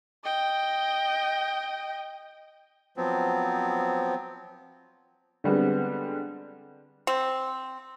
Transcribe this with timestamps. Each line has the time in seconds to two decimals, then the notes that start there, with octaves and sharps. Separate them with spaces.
0.24 D#5 G5
2.97 F3 F#3 B3 C4
5.44 D3 G3 G#3 B3 C4
7.07 C4